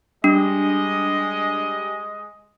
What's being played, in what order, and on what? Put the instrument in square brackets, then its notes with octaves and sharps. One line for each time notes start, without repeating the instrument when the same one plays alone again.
[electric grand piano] G3 [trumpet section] G#3 D#5 [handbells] D4